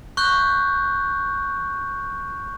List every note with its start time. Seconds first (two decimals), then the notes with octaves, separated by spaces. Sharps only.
0.17 C#6 F#6 G6